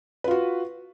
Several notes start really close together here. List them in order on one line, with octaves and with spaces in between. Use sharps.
B4 F4 F#4